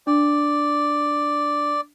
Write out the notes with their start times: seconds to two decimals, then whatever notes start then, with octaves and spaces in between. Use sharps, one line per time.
0.07 D4 D5